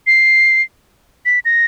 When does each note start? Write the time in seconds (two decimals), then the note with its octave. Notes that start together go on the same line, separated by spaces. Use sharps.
0.07 C7
1.26 B6
1.45 A#6